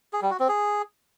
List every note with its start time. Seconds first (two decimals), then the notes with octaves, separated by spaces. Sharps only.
0.13 G#4
0.22 G3
0.31 F#4
0.40 C4
0.49 G#4